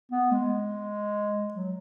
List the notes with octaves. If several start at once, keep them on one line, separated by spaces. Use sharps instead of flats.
B3
G#3
F#3